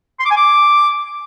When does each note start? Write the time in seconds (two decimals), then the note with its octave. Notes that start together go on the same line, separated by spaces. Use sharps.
0.19 C6
0.25 D6
0.31 G#5
0.36 D6